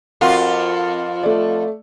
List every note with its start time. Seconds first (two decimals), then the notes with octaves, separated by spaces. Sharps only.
0.21 F2 F4 F#4 A#4 F#5
1.23 A3 D5